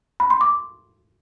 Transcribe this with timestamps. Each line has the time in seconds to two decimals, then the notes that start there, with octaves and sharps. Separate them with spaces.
0.20 B5
0.30 C6
0.41 D6